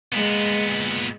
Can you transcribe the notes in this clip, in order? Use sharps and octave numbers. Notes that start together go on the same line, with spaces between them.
A#2 G#3 B3